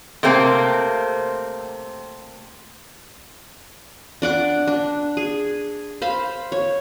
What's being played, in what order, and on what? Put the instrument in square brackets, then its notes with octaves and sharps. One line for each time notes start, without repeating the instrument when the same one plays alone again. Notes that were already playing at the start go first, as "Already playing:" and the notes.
[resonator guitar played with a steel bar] C3 A3 A#3 C4
[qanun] D4 D5 F#5 D6
D4
G#4
C5 F5 B5
C#5